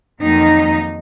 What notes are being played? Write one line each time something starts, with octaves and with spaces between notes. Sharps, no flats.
F2 D#3 F#3 A#3 D#4